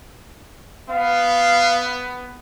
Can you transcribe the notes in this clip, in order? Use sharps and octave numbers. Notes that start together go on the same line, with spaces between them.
B3 F5